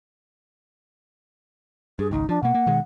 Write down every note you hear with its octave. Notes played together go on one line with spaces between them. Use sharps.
G2 G#4
G#1 C#2 D#4
F3 D4
B2 A#3 F#5
A#3
B2 D#3 G#3